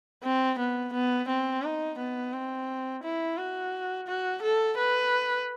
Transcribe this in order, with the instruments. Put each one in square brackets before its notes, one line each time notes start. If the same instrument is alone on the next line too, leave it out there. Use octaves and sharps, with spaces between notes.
[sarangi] C4
B3
B3
C4
D#4
B3
C4
E4
F#4
F#4
A4
B4